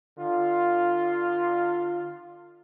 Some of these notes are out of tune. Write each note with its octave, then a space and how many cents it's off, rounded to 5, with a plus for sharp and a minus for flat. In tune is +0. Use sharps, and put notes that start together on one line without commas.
D3 +40 F4 +0